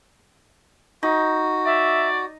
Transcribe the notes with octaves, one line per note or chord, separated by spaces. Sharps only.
D#4 F#4
D5 E5